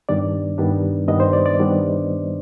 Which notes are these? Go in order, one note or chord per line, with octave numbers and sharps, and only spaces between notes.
G2 D#3 G3 B3 D4 D5
G2 D#3 G3 B3 D4
G2 D#3 G3 B3 D4 D#5
C5
D5
D5
D#3 G3 B3 D4